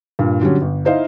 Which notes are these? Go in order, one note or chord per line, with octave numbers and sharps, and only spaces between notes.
G2 A#2
D3 F#3 G3 C#4
G1
D#4 E4 C5 D#5 F5